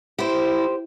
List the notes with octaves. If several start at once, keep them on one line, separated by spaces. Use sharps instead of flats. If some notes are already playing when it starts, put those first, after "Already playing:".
E4 G4 C5